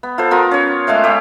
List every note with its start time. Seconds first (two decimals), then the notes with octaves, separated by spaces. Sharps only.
0.03 B3
0.18 F4 A4 C5
0.31 B3 F4 A#4
0.51 C#4 C#5
0.87 G#3 A3 F5 G5
1.04 A3 G4